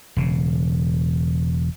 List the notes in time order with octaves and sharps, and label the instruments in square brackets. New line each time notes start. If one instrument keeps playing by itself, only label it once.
[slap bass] E1 C#3